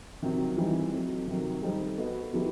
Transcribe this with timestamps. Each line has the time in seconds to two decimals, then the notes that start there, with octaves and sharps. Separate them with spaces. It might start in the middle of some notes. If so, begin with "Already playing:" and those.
0.22 C3 D#3 F#3 C4
0.57 E3 G3 C4 D#4
0.93 F#3 A3 C4
1.28 C3 D#3 F#3
1.62 G3 D#4 A4 C5
1.98 B3 F#4 A4 D#5
2.33 D#3 F#3 B3 E4 G4